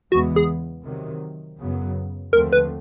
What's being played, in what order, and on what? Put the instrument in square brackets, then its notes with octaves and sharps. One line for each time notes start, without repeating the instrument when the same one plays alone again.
[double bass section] E2 C#3 E3 G#3 B3 [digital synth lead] F#4
[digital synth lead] G#4
[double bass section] C3 D#3 F#3
F#2 C#3 F#3 B3
[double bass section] D#2 D3 F3 A3 C4 [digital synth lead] A#4
[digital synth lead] B4